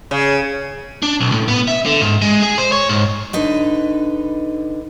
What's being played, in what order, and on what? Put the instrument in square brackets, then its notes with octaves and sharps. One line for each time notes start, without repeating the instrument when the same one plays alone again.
[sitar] C#3
[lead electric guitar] D4
B1
A2
B3
E5
D3
G#2
G#3
G#4
C5
C#5
G#2
[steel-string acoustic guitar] D3 D#4 B4